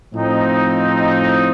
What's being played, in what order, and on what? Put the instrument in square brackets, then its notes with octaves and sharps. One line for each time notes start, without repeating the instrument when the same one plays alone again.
[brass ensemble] A2 F3 C4 D#4